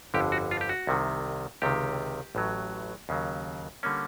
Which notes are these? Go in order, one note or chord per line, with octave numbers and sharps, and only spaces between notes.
G1 F2 D3 G4
F#4
F4
G4
F#4
C2 C3 D#3
C#2 C3 D#3 G4
A1 A2 F#3
D#2 C#3 F#3
D3 G3 A#3 C#4